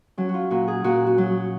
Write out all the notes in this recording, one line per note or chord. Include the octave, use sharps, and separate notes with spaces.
F#3 C#4
F#4
F4
A#2 F#4
G#4
A#2 F#4
F#4
F#3